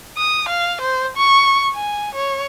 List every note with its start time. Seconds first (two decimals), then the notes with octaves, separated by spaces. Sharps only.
0.17 D#6
0.49 F5
0.81 C5
1.17 C#6
1.74 G#5
2.15 C#5